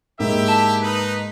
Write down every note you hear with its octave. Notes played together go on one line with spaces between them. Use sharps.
G#2 A#3 E4 G4 E5
A5
D#4 B4